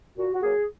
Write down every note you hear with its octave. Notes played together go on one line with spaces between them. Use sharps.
A#2 F#4
F#4
F#3 A#3 G#4